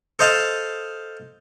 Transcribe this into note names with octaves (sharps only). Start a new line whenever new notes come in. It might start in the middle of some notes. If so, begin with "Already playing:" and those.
A4 C5 D#5 F5 A5